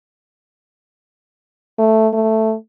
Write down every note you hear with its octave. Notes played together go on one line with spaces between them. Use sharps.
A3
A3